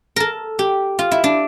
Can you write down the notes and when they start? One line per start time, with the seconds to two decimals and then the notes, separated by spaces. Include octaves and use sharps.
0.16 A4 A#4
0.59 G4
0.99 F4
1.11 E4
1.24 D4